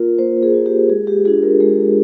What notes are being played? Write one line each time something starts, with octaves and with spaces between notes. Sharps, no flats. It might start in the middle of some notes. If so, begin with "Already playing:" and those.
Already playing: A#3 F4 A#4
A#3 C5
G#4
F4
G4
G#3 G#4
G4
D4 F4 G#4
A#4
G#3 G#4